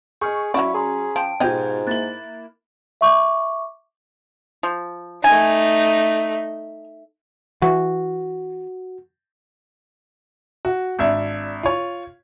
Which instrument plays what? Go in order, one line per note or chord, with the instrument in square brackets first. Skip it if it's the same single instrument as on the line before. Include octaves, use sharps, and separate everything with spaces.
[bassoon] G#4 [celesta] D#5 F6 G6 [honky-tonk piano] C#6
[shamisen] F#3 F#4 D5 [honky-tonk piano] C#4 [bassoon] E4 [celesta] F5 B5 C#6
[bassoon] G#4 [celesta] A#5 C6
[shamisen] F3 [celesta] G5 A5 D7
[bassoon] G#2 [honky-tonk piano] B2 F4 [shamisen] G4 D#5 [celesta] G6 G#6
[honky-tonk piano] A#3 E4 F#7 [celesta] F#6 A6
[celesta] E5 C#6 D6
[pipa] F3
[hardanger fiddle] A3 D#4 [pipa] G#5
[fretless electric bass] E3 [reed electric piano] F#4
[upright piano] F#4
G#1 D4 E5
F4 C#5